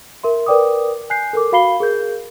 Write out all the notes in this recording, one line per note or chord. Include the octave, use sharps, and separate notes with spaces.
A#4 E5 C6
A#4 B4 D5 G5 D6 D#6
G#5 F#6 G6 C7
A4 A#4 D6
F#4 F5 B5 C7 G7
G#4 A#4 G6